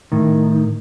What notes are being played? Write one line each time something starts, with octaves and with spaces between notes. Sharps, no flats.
A2 D#3